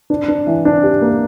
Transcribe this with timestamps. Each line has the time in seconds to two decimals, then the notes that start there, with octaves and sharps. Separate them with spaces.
0.10 D4
0.28 D4
0.47 E3
0.65 D4
0.84 G4
1.02 A#3